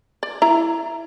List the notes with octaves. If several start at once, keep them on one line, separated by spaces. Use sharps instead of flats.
D5
E4 A#5